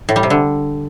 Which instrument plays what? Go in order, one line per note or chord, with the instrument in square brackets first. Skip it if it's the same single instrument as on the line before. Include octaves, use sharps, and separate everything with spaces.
[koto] A2
G3
C3
D3